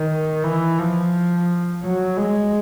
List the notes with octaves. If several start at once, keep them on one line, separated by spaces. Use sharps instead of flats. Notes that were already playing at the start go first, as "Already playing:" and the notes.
Already playing: D#3
E3
F3
F#3
G#3